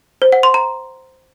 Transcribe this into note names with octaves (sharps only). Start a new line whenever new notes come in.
C5
F#5
C6
A#5